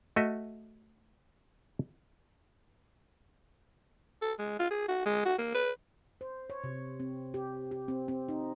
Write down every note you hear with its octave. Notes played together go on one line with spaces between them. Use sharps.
A3 F#4 D#5 E5
A4
G#3
F4
G#4
F#4
G#3
F#4
A#3
B4
C5
C#5
C3
C4
G4
G4
C4
C4
D#4